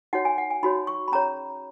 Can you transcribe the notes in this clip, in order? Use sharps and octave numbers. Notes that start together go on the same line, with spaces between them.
D#4 F#4 C#5 F#5
G#5
F#5
G#5
D#4 F#4 C#5 B5
C#6
B5
C#4 G#4 C#5 A#5